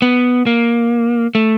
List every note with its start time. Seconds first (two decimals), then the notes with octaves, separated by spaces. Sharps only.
0.02 B3
0.47 A#3
1.35 A3